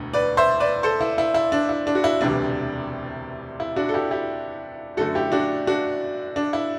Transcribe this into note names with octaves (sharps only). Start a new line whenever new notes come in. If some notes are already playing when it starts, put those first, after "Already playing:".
Already playing: E1 D2 D3
B4 D5
C5 E5
B4 D5
A4 C5
E4
E4
E4
D4
E4
D4
F#4
E4
E1 D2 C3 E3 G3 D4
E4
D4 F#4
A4
E4 G4
E4 G4
F#2 D3 A3 F#4 A4
E4 G4
D4 F#4
D4 F#4
D4
E4